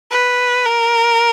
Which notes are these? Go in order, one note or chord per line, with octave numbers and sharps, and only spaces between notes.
B4
A#4